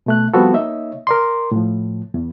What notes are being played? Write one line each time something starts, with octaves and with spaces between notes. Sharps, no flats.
B2 A3 F#6
F3 G3 B3 C4 F#4 A4
A#3 D#4 C#5 D#5 E5
A#4 D5 C6
A2 F3
E2